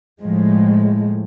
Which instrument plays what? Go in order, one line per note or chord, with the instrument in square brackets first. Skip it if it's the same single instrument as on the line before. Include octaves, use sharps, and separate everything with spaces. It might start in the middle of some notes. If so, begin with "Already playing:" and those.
[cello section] A2 F3 G#3